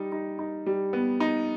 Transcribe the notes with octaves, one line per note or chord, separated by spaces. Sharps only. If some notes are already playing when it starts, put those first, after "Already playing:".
Already playing: G3 D#4
D#4
D#4
G3
B3
D#4